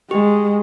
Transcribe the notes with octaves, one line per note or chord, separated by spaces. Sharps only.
G#3 G4